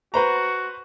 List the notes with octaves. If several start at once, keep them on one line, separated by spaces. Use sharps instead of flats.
F#4 B4 C5 A#5